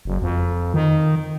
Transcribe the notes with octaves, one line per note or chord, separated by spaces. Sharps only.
F#1
F2
D#3